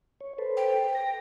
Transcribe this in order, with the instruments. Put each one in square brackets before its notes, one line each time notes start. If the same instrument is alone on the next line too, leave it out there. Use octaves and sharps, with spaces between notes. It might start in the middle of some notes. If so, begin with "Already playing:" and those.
[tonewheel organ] C#5
A4 B4 C5
[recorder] G5
[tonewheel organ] A#6